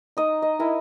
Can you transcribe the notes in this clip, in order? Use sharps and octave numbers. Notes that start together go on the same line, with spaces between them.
D#4 D#5
D#5
E4 A#4 G#5